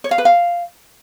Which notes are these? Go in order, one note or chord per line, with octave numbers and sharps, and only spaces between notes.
C#5
F5
B4
F5